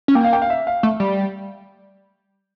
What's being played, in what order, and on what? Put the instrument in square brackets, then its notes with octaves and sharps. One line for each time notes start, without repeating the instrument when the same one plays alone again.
[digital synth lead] C#4
[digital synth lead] A#3 [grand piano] G5
[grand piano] F5
G5
F5
E5
F5
[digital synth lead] A3
G3